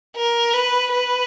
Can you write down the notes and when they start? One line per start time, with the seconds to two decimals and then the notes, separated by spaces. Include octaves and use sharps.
0.16 A#4
0.53 B4
0.92 B4